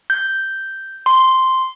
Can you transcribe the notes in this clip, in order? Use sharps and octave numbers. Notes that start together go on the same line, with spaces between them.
G6
C6